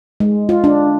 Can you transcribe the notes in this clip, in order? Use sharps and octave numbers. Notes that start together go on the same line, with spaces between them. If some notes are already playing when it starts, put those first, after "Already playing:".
G#3
F4
D4